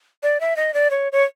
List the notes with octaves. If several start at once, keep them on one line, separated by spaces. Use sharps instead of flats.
D5
E5
D#5
D5
C#5
C#5